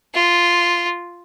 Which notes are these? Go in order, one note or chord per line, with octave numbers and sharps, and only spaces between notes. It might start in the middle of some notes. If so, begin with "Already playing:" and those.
F4